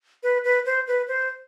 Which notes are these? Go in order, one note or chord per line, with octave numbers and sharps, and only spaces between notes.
B4
B4
C5
B4
C5